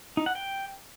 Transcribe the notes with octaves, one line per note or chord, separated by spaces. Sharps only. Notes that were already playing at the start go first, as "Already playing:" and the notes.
D#4
F#5
G5